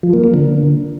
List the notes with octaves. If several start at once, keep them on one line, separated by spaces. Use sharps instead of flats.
F3
A#3
A#3
D3